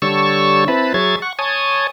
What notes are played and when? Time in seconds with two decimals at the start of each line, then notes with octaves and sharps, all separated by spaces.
0.02 D3 G3 C#5 A5 C#6 E6
0.68 C4 E4 B4 A5 B5
0.94 F#3 G#4 C#5 E5 G#6 A6
1.22 F#5 C#6
1.39 C#5 G#5 A5 D#6